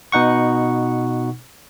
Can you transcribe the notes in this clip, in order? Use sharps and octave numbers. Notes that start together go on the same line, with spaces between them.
B2 D#4 F#5 C#6